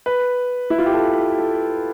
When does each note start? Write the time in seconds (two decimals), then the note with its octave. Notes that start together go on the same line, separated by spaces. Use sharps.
0.06 B4
0.70 E4
0.78 F4
0.86 G4
0.94 A4
1.38 A4